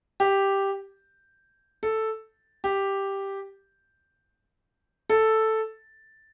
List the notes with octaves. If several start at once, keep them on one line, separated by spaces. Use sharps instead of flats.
G4
A4
G4
A4